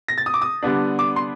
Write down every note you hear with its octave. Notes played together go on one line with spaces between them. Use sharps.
A#6
A6
D#6
D6
D#6
D3 G3 B3 D4
D6
C6